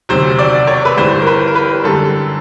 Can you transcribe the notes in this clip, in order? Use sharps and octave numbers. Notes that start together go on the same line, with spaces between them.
E1 D2 C3 D#3 F#3 C5
D5
C#5
B4
G1 G2 E3 C5
A#4
B4
A#4
B4
F#2 D3 G3 A4